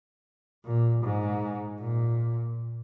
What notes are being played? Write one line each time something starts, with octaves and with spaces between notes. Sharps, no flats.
A#2
G#2
A#2